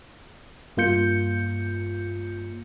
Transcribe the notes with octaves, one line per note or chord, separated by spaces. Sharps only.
G2 A#3 F4 G6 C#7